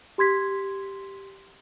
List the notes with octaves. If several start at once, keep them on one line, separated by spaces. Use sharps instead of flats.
G4 C6 G#6 B6